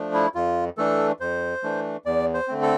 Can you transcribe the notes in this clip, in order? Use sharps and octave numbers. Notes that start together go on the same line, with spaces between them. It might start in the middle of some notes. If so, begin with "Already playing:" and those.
Already playing: F3 A3 D4
E4
F2 F4
E3 A3 D4 A4
F2 C5
E3 A3 D4
E2 D5
C5
D3 A3 C4
A4